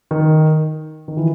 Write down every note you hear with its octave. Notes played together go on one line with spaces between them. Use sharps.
D#3
D#3
E3